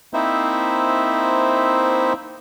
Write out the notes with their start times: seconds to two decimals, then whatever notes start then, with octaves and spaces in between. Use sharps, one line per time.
0.14 A#3 C4 D#4 E4 C5 E5